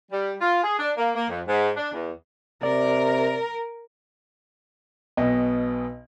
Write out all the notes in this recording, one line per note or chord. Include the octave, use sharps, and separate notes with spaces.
G3
F4
G#4
D4
A#3
A#3
F2
G#2
D4
E2
C3 A#4 D5
B1 B2 D#5